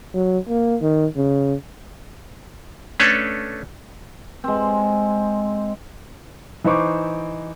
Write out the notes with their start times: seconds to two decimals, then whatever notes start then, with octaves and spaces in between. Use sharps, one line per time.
0.14 F#3
0.49 A#3
0.82 D#3
1.16 C#3
3.00 A3 C#4 D4 A4 B4 C#5
4.44 G#3 C4
6.64 E3 D#4 C5 C#6 D6